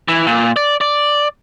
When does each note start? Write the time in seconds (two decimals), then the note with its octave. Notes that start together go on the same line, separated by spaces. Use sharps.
0.08 E3
0.27 A#2
0.56 D5
0.81 D5